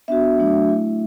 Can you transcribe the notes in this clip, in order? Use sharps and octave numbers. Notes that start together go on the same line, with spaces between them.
B3 D4 F#4 E5
F#3 A3 D4 F#4
A3 E4